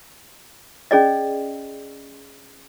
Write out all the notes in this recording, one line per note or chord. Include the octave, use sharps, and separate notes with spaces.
C#4 G#4 D5 D#5